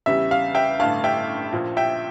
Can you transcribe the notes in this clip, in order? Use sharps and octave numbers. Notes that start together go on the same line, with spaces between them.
E2 C#3 G3 E5
F5
E5 G5
A1 G2 D3 A3 F5 A5
E5 G5
A#1 A#2 F3
E5 G5